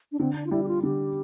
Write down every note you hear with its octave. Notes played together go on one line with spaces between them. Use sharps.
D4
D3 C4
D4
F4
G3 E4
G4
F4
D3 G4